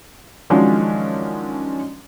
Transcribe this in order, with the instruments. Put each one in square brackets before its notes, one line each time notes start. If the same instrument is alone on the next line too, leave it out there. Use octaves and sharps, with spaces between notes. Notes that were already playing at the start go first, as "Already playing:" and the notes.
[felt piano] D#3 F3 F#3 G#3 C#4 D4